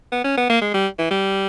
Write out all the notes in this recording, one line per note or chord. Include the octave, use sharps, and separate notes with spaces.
B3
C#4
B3
A#3
G#3
G3
E3
G3